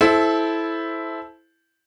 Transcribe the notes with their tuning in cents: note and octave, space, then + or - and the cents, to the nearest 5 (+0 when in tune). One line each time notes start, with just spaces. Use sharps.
E4 +0 A4 -20 C5 +0